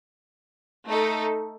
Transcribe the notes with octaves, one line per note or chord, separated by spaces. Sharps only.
A3 D#4 A4